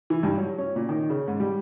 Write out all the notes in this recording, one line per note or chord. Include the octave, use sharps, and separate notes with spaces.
E3
G2
F#3
C#4
A#2
D#3
C#3
G#2
G3